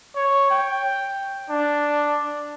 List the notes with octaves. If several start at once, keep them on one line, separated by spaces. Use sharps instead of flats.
C#5
G5
D4